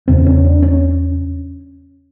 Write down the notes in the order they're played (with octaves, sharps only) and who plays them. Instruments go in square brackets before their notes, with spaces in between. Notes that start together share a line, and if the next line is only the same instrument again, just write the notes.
[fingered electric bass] E2 C#3 C4
C#4
D4
C#4